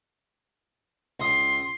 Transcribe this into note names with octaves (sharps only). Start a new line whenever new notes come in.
C#2 D#5 C6